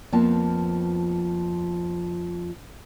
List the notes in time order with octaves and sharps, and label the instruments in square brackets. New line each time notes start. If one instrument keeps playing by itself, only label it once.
[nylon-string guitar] F2 F3 A#3 B3 A5